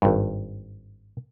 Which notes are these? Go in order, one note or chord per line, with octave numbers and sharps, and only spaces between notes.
G#1 G2